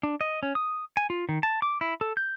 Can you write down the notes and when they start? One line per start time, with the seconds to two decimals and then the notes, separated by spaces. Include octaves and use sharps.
0.03 D4
0.21 D#5
0.43 C#4
0.55 D#6
0.97 G#5
1.10 F4
1.29 D#3
1.43 A5
1.62 D6
1.81 E4
2.01 A4
2.17 G6